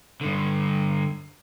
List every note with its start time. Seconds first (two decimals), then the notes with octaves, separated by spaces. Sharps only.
0.21 G2 D3